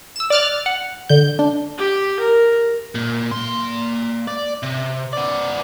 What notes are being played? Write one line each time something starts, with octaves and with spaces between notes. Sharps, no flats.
E6 E7
D5 D6 F6 F#6 A6
F#5
D3 G6
D4
G4
A#4
A#2
A#3 C6
D5
C3
B3 D5